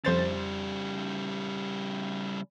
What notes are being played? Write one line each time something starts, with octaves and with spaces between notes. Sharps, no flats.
F2 C#3 G3 C5 A6